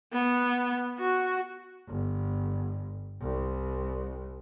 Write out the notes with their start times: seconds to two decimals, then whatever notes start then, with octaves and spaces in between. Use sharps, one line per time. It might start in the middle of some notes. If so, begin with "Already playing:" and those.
0.13 B3
0.98 F#4
1.88 G1
3.21 C2